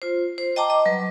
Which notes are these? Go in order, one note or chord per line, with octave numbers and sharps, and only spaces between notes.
F4 C5
C5
D#5 G5 A5 A#5 D6
D#5
F#3 G3 B4